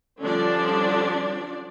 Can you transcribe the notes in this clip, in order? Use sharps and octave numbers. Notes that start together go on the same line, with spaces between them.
D3 F3 G3 C#4 D4 D5